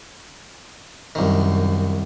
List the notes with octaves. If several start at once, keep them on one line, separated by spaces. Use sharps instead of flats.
C2 F#2 D#3